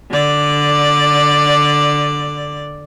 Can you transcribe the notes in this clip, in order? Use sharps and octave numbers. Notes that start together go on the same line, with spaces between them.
D3 D5